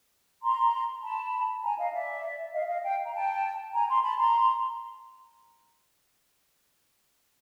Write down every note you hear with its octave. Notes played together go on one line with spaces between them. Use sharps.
A#5 C6
A5 B5
G#5 A#5
D#5 F5
D5 E5
D#5 F5
D#5 F5
F5 G5
A#5
G5 A5
G#5 A#5
A#5 C6
A5 B5
A#5 C6